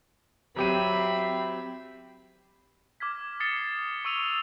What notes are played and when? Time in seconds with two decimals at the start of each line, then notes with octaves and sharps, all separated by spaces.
0.56 F#3 C4 G4 E5 B5 D#7
3.00 D6 F6 G#6 B6
3.40 D#6 A6 C7 C#7 E7 G7
4.05 C#6 E6 D#7 F7 G7